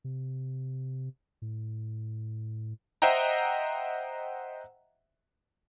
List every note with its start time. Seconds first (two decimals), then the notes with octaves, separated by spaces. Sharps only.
0.04 C3
1.42 A2
3.02 C5 D#5 E5 F#5 G5 A#5